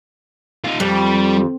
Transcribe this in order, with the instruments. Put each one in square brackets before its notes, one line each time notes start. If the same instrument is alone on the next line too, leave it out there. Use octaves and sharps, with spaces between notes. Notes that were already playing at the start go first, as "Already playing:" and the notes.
[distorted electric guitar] D#4 F4
[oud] F2 [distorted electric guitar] G3